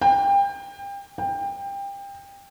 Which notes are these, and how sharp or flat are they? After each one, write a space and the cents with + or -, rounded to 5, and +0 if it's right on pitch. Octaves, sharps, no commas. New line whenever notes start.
G5 +30
G5 +25